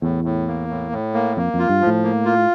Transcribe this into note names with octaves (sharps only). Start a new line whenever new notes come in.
E2 A2
A2
A#3
A2
A2
A#3
F2 A#3
F2
F4
G2
F3
A2
A#3
F4